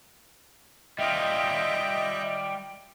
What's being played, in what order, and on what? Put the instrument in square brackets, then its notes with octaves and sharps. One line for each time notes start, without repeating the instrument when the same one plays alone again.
[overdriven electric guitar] G3 F4 [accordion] D#5 E5 G5